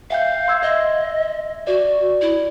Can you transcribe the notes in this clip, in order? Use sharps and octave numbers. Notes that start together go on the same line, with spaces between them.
E5 F5 G5 G6
C6 E6 G#6
D#5 E5
F#4 D5
E4